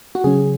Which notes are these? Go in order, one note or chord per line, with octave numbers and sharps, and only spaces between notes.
F#4
C#3 F#3 C#4 G#4